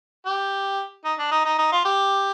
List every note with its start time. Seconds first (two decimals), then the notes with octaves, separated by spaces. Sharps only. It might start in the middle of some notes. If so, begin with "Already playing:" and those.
0.26 G4
1.04 D#4
1.19 D4
1.31 D#4
1.45 D#4
1.58 D#4
1.72 F4
1.85 G4